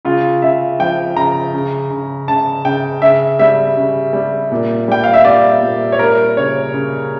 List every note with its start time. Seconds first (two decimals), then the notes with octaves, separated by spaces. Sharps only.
0.05 C#3 F4
0.42 C#3 E5
0.79 F3 G5
1.16 C#3 A#5
1.54 C#3
1.91 C#3
2.28 C#3 A5
2.65 C#3 G5
3.02 C#3 E5
3.39 G3 E5
3.77 C#3
4.13 G3
4.52 A#2
4.88 G3 G5
5.04 F5
5.14 E5
5.25 G3 D5
5.63 A#2
5.92 C#5
5.99 G3 A#4
6.37 C#3 C#5
6.74 C#3